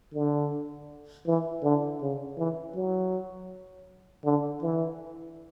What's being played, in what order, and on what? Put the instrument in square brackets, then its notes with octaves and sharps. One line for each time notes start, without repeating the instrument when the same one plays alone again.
[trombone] D3
E3
D3
C#3
E3
F#3
D3
E3